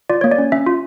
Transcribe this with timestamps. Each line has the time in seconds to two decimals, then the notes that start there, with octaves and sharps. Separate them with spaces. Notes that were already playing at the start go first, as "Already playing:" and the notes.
0.10 F4 D5
0.21 C#5
0.24 A#3
0.32 D5
0.38 C#4
0.52 C#4 E5
0.66 F4